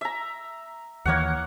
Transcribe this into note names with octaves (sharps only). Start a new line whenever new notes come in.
E5 A#5
D#2 E3 A#3 C#5 F#5